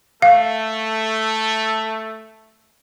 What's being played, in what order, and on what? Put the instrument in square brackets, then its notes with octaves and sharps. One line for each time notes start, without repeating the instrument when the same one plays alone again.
[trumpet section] A3 [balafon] F5